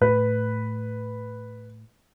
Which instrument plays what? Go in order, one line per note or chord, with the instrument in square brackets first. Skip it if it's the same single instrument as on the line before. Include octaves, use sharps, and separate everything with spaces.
[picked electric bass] A2 [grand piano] B4